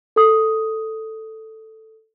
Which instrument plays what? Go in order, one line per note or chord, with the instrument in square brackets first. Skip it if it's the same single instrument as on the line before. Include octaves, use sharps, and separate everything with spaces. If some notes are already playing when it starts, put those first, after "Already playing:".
[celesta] A4 D#6